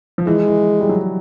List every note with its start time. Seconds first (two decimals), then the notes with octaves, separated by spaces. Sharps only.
0.18 F3
0.27 E3 G#3
0.47 E3
0.80 G3
0.89 F#3